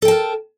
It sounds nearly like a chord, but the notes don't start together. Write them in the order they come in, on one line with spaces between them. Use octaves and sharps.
A4 G5 A5 A#4